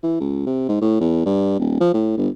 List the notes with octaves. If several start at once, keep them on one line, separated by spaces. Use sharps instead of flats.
E3
C#2
C3
G#2
A2
E2
G2
D#1
F3
A2
G1